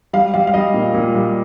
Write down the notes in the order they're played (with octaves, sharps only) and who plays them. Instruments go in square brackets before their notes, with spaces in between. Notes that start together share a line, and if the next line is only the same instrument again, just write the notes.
[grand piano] G3 F5
G3 F5
F5
G3 D#5
A#2
A#2
G3